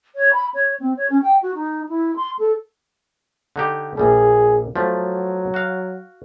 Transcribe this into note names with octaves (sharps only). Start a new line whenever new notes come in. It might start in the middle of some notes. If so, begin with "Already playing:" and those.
C#5
B5
C#5
C4
C#5
C#4
G5
F#4
D#4
E4
C6
A4
D3 D#4 G4
A#1 G3 G#4
F3 F#3 A3
F#4 F5